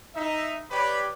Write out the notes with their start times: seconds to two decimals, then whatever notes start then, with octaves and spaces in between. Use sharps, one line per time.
0.15 D#4 E5
0.71 G4 B4 C#5 D5 B5